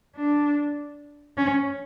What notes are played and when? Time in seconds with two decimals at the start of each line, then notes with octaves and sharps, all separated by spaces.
0.16 D4
1.37 C#4